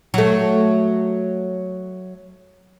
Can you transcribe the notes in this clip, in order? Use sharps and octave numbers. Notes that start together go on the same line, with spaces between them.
F#3 A3